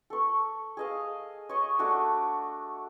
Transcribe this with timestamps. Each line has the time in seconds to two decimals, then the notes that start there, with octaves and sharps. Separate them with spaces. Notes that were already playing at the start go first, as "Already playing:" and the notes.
0.10 A4 C#6
0.77 G#4 D#5 F5
1.49 C#5 D#5
1.79 A3 D4 F#4